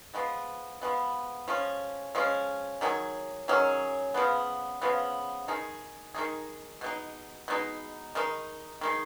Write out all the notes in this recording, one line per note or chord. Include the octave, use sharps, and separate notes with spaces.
F3 G#3 B3
F3 G#3 B3
F3 G#3 C#4
F3 G#3 C#4
D#3 F#3 C#4 G#4
D#3 F#3 C#4 G#4
C#3 F3 G#3 B3
C#3 F3 G#3 B3
D#3 G#3 D#4 G#4
D#3 G#3 D#4 G#4
B2 G#3 D#4
B2 G#3 D#4
D#3 G#3 D#4
D#3 G#3 D#4